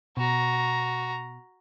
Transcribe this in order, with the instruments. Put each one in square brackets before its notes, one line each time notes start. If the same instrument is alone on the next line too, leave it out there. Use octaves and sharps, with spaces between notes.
[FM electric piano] B2 [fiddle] F#4 A#5